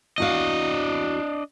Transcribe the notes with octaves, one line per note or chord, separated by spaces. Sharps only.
E2 D4 F#4 D#5 F5